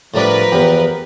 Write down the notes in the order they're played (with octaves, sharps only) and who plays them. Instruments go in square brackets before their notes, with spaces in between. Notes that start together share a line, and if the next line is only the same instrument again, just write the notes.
[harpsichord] A2 G3 D4 [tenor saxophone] F3 [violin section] A#4 B4
[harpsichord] E2 [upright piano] B3 G4